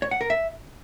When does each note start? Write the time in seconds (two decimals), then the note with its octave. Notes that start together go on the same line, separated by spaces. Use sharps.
0.02 C#5
0.11 F#5
0.21 A#4
0.30 E5